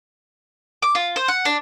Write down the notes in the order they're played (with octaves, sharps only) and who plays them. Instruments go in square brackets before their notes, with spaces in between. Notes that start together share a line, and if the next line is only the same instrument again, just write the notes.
[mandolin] D6
F4
C5
F#5
D4